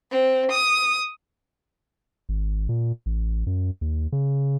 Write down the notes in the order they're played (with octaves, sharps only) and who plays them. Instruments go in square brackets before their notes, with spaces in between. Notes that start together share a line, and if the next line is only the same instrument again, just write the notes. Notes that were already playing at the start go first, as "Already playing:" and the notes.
[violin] C4
D#6
[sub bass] G#1
A#2
A1
F#2
D#2
C#3